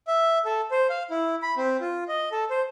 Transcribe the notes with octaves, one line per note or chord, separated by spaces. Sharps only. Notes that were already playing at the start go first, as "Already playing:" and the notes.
E5
A4
C5
F5
E4
B5
C4
F4
D#5
A4
C5